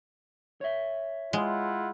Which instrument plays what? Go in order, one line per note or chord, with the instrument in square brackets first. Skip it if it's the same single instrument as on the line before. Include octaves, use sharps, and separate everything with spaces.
[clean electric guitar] C#5 E5
[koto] G#3 [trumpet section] E4 F4 F#5